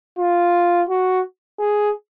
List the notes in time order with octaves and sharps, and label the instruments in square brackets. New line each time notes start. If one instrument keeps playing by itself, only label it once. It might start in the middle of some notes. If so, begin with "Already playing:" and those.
[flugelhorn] F4
F#4
G#4